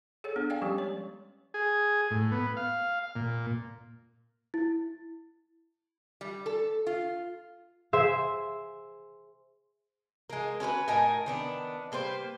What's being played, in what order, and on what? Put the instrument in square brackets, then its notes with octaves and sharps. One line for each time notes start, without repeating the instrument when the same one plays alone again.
[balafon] G#4 A4 C#5
B3 D4
D5 F5 G5 G#5
F3 G3 G#3 C#4 G4
C#5
[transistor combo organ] G#4
A2
B3
F5
A#2
[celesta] E4
[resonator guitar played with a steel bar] G3
A4
F4
[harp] G#4 C5 E5
[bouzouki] G#3 A#3
C#4 F#4 A#4 B4
A2 D#4 A#4 G#5
D#3 B3 D4
G3 A#3 B4 C5